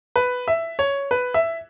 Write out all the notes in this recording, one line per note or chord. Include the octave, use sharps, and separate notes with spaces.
B4
E5
C#5
B4
E5